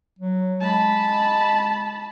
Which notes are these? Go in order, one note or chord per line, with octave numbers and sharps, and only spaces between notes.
F#3
G#3 A5 B5